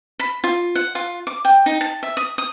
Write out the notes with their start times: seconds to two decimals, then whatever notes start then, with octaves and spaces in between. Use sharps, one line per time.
0.19 B5
0.44 F4
0.75 F#5
0.95 F4
1.27 D6
1.45 G5
1.66 D#4
1.81 A5
2.03 E5
2.17 D#6
2.38 D#6